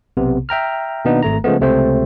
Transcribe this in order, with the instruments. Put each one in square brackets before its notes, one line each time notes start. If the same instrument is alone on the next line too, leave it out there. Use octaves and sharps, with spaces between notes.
[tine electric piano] B1 C3 B3
E5 G5 A#5 F6
B2 D#3 A#3 B3 D4 D#4
G#1 A3 A#5
C#3 F3 G#3 A3 B3
C#2 C3 A3 C4 C5